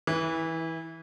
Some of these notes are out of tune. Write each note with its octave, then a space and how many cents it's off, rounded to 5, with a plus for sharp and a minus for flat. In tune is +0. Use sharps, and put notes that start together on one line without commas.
E3 -20 E4 +0